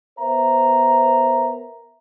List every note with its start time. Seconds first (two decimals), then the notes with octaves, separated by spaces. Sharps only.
0.20 B3 A#4 C5 E5 A#5